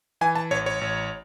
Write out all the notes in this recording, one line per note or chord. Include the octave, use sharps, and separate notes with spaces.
E3 G#5
A5
A1 C#5
C#5
A1